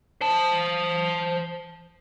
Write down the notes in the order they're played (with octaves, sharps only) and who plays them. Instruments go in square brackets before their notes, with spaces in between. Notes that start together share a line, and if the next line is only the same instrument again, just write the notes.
[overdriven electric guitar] C5 A5